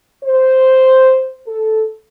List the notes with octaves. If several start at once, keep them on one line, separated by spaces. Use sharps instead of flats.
C5
A4